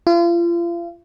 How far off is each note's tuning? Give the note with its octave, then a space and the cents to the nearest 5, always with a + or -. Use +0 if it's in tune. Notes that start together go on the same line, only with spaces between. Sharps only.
F4 -35